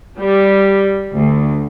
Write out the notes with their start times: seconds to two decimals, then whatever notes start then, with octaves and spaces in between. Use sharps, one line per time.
0.19 G3
1.14 D2